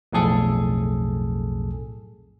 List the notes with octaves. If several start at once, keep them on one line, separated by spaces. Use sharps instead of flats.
B1 F2 A2 G#4 A4